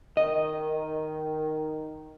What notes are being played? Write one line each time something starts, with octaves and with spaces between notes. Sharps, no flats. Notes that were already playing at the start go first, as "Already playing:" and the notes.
D#3 D#5